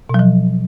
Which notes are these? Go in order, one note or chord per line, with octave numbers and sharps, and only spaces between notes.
B2 F3 F#3